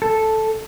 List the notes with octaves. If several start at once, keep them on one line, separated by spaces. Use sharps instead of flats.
A4